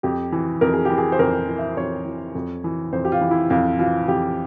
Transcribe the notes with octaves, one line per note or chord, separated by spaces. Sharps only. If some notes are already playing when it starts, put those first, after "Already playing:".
F2 G4
E3
F2 A#4
G#4
E3 G4
G#4
C5
F2 A#4
E3
E5
F2 C#5
E3
F2
E3
F2 C5
G4
F4
E3
E4
F2 F4
E3 F4
F2 G4